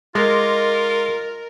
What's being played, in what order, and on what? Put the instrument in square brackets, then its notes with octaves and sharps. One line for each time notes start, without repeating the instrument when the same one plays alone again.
[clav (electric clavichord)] G#3 [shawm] F4 [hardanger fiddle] A#4 [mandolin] D#5 C6 D6